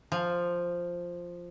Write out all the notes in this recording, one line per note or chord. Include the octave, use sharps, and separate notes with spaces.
F3